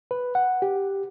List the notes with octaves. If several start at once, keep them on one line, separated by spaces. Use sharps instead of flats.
B4
F#5
G4